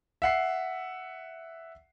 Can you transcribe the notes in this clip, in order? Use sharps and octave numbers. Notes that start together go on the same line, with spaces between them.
E5 F#5 C7